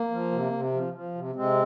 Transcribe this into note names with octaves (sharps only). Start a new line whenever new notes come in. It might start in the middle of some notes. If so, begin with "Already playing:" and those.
Already playing: A#3
F3
C3
C3
F3
F3
C3
C3 G#3 C4